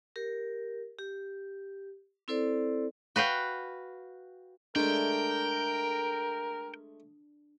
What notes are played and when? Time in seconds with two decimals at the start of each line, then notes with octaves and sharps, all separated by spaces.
0.16 G4 A#4
0.99 G4
2.28 C4 E4 A4 C5 D5
3.16 F#4 B4 F5 G5
4.76 G#3 A3 D4 A#4 G5